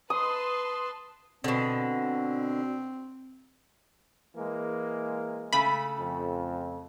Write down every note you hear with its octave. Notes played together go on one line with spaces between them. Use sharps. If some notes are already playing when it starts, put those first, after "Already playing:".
B4 A5 C6 D#6
B2 D3 C4
E3 G#3 A#3
C#3 A3 B5
F2